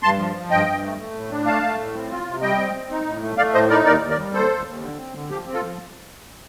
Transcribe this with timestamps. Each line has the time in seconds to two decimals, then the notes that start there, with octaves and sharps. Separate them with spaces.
0.03 G2 A5 C6
0.18 F3
0.35 F3
0.51 G2 D#5 G5
0.67 G2
0.83 A3
0.98 A3
1.15 A2
1.30 D4
1.46 A3 F5 A5
1.63 A3
1.79 A2
1.94 C4
2.10 F4
2.26 C3
2.42 G3 D#5 G5
2.58 C4
2.75 C4
2.91 D#4
3.06 A2
3.22 A3
3.38 A3 D5 F5
3.54 A2 C5 D#5
3.69 D#4 A#4 D5
3.86 D#2 A#4 D5
4.01 D#2
4.10 A#4 D5
4.18 G3
4.33 D#2 A4 C5
4.50 D#2
4.66 D#2
4.81 D3
4.98 C4
5.14 D3
5.29 F3 G4
5.46 C4
5.54 F4 A4
5.62 F3